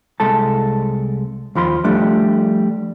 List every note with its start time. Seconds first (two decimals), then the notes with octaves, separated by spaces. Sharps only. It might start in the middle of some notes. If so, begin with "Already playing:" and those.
0.20 C2 G#3 A4 A5
1.55 D#2 F3 B5 C6
1.84 F3 G3 A3 D4